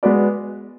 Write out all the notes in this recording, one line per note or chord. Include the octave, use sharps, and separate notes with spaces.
G#3 B3 F#4 B4 D5